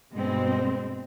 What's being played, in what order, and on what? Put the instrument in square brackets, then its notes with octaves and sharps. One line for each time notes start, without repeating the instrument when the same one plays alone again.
[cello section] G2 B2 G#3 C4